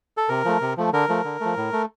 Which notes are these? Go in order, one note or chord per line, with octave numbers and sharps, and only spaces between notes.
A4
C3 A#4
F3 A3
C3
F3 A3
D3 A#4
F3 A3
D3
F3 A3
A2
A3